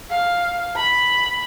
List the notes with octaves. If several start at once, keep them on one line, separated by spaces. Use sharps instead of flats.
F5
B5